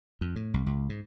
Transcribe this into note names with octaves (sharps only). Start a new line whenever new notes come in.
F2
A2
C2
C#2
G#2